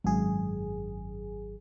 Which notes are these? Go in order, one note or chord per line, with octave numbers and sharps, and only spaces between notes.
G#1 F#2 G#4